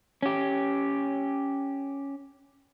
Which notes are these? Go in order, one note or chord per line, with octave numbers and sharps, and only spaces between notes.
C#4 G4